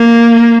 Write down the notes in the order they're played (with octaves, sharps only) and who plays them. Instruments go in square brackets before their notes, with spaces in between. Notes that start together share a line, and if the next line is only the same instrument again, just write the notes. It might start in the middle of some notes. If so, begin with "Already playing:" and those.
Already playing: [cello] A#3